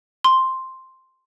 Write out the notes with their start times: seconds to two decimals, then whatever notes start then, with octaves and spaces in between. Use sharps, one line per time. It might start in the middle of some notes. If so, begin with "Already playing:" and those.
0.24 C6